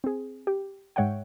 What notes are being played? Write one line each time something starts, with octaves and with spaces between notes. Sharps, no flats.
C4 G#4
G4
G#2 G#3 C#5 E5 F#5 G5